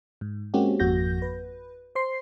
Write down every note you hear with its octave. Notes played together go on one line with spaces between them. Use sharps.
G#2
G#3 A#3 C4 C#4 F#4 G4
G#1 F2 A#3 F#4 G6 A#6
B4
C5 C6 C7